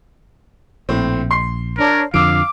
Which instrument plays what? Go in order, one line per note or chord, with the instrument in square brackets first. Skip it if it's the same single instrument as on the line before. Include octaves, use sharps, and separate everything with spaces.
[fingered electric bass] A#1 [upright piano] A2 C4
[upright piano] C6 C7
[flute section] D4 C#5 [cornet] A#4
[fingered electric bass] F2 D3 F3 [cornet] F5 [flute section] D6 [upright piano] E6 D7